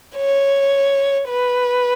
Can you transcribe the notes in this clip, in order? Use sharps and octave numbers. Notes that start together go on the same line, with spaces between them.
C#5
B4